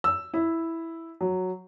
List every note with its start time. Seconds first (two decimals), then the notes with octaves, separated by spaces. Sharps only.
0.04 E6
0.34 E4
1.21 F#3